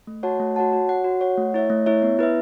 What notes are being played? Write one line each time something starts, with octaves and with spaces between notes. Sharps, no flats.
A3
F#4 C#5 F#5 A5
A3
F#4 C#5 F#5 A5
F#4
C#5 F#5
F#4
C#5 F#5
A3
E4 C#5 E5
A3
E4 C#5 E5
B3
E4 B4 E5